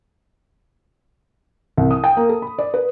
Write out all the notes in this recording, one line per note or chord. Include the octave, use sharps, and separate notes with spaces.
C2
D#6
G5
A#3
A4
B5
D5
B4